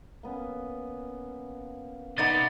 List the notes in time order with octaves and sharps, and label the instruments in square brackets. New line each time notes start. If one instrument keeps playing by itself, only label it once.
[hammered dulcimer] A#3 B3 C#4
[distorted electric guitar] C3 [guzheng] B3 D#4 D5 [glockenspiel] A6